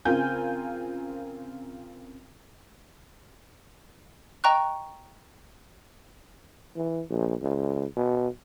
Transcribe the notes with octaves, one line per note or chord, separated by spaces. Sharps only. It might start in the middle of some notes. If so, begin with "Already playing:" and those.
C#3 C4 F4 A#4 G#5 G6
D#5 G5 A#5 C#6 F#6
E3
A#1
C#2
B2